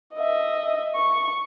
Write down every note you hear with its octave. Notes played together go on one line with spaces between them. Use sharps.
D#5 E5
C#6